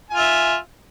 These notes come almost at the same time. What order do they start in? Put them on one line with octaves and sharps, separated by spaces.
G#5 F4 E5